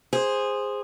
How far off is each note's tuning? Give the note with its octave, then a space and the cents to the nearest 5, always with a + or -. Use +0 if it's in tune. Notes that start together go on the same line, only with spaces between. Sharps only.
G#4 -15 C5 +0